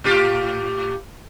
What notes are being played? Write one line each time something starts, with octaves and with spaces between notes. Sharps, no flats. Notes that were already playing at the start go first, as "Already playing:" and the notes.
A2 F4 G4